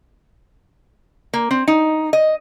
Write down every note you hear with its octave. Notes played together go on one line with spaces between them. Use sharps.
A#3
C4
D#4
D#5